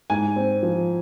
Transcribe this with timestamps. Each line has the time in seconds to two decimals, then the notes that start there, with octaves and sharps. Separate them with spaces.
0.10 G#2 G#5
0.36 C4
0.63 F3